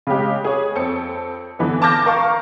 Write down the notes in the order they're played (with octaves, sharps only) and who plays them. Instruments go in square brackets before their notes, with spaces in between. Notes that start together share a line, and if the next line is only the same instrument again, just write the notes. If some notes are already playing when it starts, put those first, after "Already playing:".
[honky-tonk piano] C#3 G#3 G4
G#4 C#5
F2 C4 A4 C#7
D3 E3 B3
A5 D6 F6 G6 A#6
A#4 F5 C#6